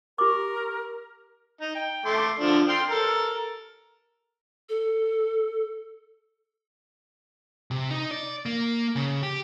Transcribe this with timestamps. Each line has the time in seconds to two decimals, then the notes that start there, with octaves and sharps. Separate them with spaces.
0.18 G4 A#4 D6
1.61 D#4
1.75 G5
2.05 A3 C6 D6
2.40 D3 F3 D4
2.68 G5 C6 F6
2.90 A4 A#4
4.69 A4
7.71 C3
7.91 D#4
8.11 D5
8.46 A#3
8.96 C#3
9.23 G4